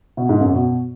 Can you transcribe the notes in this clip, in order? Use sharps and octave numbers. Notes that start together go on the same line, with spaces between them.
B2
G#2
F#2
B2